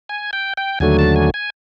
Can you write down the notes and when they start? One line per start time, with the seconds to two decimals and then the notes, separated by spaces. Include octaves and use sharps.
0.09 G#5
0.33 G5
0.57 G5
0.80 D#2 D3 F#3 A3 G#5
0.99 A5
1.16 G#5
1.34 G#5